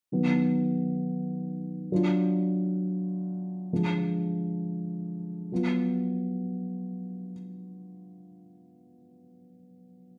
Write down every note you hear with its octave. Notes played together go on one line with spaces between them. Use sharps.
D#3 F#3 B3
F#3 D4 F4
D3 F3 G#3
F#3 B3 F4